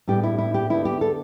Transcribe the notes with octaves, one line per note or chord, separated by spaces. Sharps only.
A2 G3 B3 D4 G4
E4
E4
G4
D3 B3 D4 E4
G4
A4